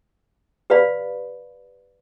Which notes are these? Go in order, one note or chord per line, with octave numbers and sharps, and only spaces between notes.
G4 B4 D5 F5 B5